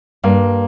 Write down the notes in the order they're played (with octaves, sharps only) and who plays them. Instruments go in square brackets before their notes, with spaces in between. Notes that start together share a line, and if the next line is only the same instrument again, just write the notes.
[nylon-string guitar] G2 [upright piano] A#3